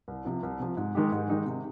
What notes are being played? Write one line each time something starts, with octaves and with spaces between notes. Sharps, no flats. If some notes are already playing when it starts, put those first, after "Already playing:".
C2
C3 F3
C2
C3 F3
G#2
D#3 G#3 D#4 G4
G#2
D#3 G#3 D#4 G4
C3